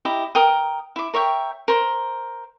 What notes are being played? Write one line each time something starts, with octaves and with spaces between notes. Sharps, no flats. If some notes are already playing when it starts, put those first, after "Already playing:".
E4 G4 D#5 A#5
A#4 G5 D#6
E4 D6
A#4 C#5 E5 G5
A#4 C5